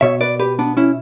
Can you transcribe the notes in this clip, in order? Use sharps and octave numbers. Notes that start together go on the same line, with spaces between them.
B2 C#5 E5
B4 D5
G4 B4
B3 D4
C#4 E4